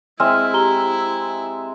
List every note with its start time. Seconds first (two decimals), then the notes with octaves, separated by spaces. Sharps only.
0.20 G#3 C4 E4 E5 F6
0.54 G4 A#5 G7